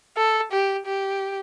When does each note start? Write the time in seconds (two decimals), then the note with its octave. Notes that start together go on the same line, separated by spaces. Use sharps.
0.17 A4
0.52 G4
0.86 G4